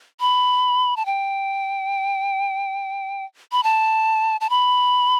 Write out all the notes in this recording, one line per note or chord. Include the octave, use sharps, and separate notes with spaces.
B5
A5
G5
B5
A5
A5
B5